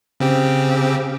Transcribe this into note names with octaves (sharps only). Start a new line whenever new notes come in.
C#3 C4 G4